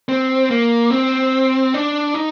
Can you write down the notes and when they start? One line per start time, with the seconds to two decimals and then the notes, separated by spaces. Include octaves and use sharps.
0.09 C4
0.50 A#3
0.90 C4
1.74 D4
2.14 D#4